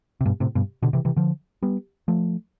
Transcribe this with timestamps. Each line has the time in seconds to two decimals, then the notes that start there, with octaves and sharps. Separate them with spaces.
0.21 C3
0.26 G2 B2
0.40 A2 C3
0.55 G2 B2
0.83 B2 D3
0.93 C3 E3
1.05 C3 E3
1.16 D3 F3
1.62 G3 B3
2.08 F3 A3